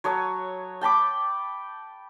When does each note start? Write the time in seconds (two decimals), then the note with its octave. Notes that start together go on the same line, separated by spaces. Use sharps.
0.04 F#3 C#5 A5 D#6
0.81 G5 A5 B5 D6